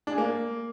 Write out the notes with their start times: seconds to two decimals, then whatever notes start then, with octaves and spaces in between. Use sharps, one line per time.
0.07 D4
0.12 G#4
0.18 A#3